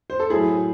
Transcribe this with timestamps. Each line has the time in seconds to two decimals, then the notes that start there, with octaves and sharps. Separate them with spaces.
0.10 C5
0.20 A4
0.30 A2 F#3 E4 G#4